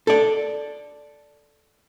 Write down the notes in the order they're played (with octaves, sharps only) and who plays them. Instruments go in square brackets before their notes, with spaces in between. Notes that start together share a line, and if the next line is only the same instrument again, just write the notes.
[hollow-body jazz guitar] A4 D5